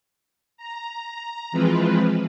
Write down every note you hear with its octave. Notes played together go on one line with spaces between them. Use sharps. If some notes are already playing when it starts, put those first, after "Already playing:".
A#5
E3 F3 G#3 C4 F4 B4